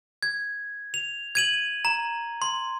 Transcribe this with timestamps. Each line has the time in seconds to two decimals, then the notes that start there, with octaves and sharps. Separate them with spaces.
0.22 G#6
0.94 F7
1.35 G#6 D#7 F#7
1.85 A#5
2.42 C6